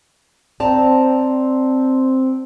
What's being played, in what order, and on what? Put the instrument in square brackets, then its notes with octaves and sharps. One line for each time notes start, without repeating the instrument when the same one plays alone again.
[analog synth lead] C4 [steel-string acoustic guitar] D5 A5 A#5